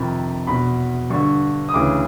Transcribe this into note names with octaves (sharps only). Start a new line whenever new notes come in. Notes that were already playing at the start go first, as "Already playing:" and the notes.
Already playing: F2 C3 D#3 B5
E2 B2 B5
G2 D3 C#6
D#6
D2 C#3 E3 D6